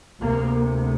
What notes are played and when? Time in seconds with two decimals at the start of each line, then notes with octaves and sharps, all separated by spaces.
0.21 D2 C3 A#3